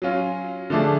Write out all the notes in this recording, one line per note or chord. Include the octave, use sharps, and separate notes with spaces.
F#3 C#4 F4
D3 F3 A3 D4 G#4